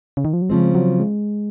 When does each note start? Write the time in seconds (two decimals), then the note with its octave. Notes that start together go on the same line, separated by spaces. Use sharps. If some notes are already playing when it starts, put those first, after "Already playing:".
0.17 C#3
0.25 D#3
0.33 F3
0.42 F#3
0.49 C#3 F3 G#3 C4
0.75 F#3
1.00 G#3